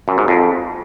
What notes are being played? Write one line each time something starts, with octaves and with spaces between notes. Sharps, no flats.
F#2
G#2
F2